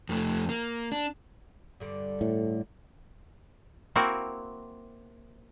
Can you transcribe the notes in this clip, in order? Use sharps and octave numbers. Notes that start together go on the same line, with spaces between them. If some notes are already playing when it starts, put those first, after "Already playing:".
F2 A3
A#3
D4
G2 D3 G3
A2
A#3 C4 E4 F#4